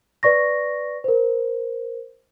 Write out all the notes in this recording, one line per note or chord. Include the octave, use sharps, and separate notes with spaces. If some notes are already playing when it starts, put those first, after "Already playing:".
B4 D5 C#6 A#6
A#4 C5